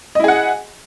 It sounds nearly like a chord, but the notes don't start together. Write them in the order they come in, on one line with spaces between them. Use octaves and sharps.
D#5 E4 G#4 F#5